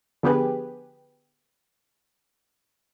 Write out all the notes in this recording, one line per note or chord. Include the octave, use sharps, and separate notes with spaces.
D3 F3 B3 G4 G#4 B4